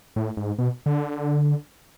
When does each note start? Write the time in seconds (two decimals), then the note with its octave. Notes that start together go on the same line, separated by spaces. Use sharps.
0.16 A2
0.37 G#2
0.59 B2
0.86 D3